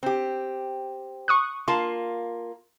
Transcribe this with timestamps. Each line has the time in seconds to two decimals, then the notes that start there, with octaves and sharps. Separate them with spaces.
0.03 C4 G4
1.28 C#6 D#6 F#6
1.68 A#3 F4 A5 C6